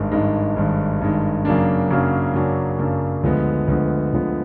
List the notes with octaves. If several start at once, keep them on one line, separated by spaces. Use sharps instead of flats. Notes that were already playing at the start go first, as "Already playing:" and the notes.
Already playing: G#1 G2 D#3 G#3
G#1 G2 D#3 G#3
G#1 G2 D#3 G#3
G#1 G2 D#3 G#3
F#2 C#3 F#3 A#3 D4
F#2 C#3 F#3 A#3 D4
F#2 C#3 F#3 A#3 D4
F#2 C#3 F#3 A#3 D4
D2 D3 F3 G#3 B3
D2 D3 F3 G#3 B3
D2 D3 F3 G#3 B3